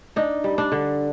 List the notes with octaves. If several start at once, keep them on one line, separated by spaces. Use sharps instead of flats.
D4 D#4
G3
D4
D3